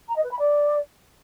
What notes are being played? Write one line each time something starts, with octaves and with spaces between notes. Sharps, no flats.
A#5
D#5
B4
B5
D5